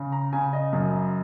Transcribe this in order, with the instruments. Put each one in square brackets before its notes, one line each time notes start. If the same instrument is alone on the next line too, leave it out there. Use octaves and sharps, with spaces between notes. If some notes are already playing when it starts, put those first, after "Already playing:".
Already playing: [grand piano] C#3
A#5
C#3 G#5
D#5
F#2